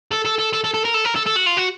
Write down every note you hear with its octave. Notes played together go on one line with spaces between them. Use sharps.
A4
A4
A4
A4
A4
A4
A#4
A4
A#4
A4
A4
F#4
F4
F#4